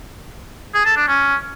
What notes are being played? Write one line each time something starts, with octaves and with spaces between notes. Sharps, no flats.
G#4
A4
D4
C#4